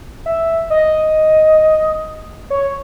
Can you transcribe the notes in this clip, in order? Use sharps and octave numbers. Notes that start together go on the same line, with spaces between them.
E5
D#5
C#5